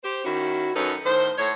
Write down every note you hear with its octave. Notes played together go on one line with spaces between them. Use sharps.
G4 C5
D#3 C#4 E4 F#4
F#2 C#4 D#4 A4 B4
A2 D#3 C5
A2 C#5